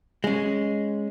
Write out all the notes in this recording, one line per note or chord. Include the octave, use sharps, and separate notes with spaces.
G#3 C#4